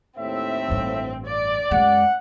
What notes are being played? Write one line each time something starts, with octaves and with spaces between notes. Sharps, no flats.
D#2 A2 C4 E5
A1 G2
D5
F#2 G#3 F#5